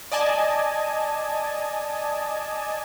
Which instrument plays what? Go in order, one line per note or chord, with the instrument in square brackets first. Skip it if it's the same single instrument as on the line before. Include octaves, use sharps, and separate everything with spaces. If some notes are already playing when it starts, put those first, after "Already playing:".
[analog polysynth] D5 D#5 G#5 A5